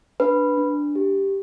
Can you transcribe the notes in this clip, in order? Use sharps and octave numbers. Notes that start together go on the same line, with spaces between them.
D4 B4
D4
G4